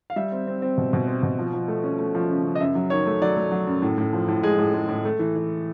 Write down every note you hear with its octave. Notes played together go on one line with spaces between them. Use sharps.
F5
G3 E5
C4
C4
C4
B2
B2
C4
B2
F3
F3
A3
C#4
A3
F3
C#3
C#3
D#5
F#2 E5
F#3
D#3 C#5
A3
F#3 D5
A3
F#3
F#2
A2
A2
F3
A2
G#3 G#4
A2
G#3
A2
A3
E3
E3